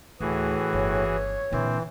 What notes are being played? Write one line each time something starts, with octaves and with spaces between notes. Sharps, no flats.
D2 A2 E3 F#4 G#4
G1 C#5
A#2 D3 E3 C4